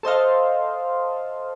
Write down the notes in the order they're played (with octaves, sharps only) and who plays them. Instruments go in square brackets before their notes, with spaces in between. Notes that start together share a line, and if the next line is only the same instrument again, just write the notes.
[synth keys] A4 C5 D#5 F5